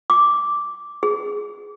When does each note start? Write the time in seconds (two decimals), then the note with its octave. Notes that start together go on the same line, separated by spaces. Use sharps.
0.10 D6
1.03 G#4